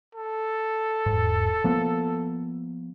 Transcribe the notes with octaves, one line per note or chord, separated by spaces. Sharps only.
A4
E1 G#2
F3 A#3 B3